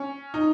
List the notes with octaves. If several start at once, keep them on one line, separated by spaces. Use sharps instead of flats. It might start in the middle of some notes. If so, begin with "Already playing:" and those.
Already playing: C#4
D#4